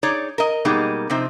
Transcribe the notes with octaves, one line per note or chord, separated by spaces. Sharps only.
D#4 G#4 C#5 D5
A#4 D#5
B2 G3 G#3 A#3 D#4
C3 F3 C4 D#4